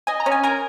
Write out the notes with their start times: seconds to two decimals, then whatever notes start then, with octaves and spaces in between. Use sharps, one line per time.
0.07 D#5 G#5
0.20 A#5
0.26 C#4
0.32 G#5
0.43 A#4 G#5